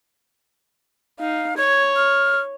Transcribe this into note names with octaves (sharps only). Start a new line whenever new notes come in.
D#4 F5
C#5 G#6
F6